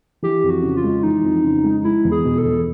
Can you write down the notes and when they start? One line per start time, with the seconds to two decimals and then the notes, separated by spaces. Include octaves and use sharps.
0.22 E3 G4
0.44 F2
0.50 F#4
0.63 C#3
0.77 F4
0.84 G#3
1.03 E3 D#4
1.23 F2
1.44 C#3
1.64 G#3
1.84 G#3 E4
2.05 E2
2.12 G#4
2.25 B2
2.38 A4
2.45 E2